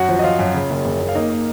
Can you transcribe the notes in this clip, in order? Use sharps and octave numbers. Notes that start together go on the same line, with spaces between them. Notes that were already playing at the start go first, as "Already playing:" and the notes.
Already playing: F#2 F#4 F#5
F3
D#5
F3 F4 F5
F#2
C#3
F#1
F#1
F#1
F5
A#3 D#4 D#5
A#3